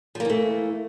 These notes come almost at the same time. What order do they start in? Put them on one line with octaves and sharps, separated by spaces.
F3 A#3 E3 A3